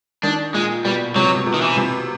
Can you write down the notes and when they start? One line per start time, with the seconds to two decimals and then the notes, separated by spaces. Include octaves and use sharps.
0.23 D#3 D4
0.54 A#2 G#3
0.85 B2 G3
1.16 C3 F#3
1.36 C3
1.46 B2
1.54 D#3
1.62 E3
1.77 C3